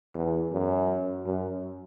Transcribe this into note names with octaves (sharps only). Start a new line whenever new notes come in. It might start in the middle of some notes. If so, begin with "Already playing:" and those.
E2
F#2
F#2